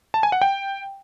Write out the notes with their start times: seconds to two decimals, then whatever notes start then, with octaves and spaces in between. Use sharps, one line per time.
0.14 A5
0.23 G#5
0.32 F#5
0.42 G5